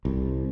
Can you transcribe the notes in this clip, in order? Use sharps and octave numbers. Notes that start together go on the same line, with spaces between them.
C2